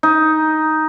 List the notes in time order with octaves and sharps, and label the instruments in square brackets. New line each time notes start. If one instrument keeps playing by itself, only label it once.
[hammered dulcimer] D#4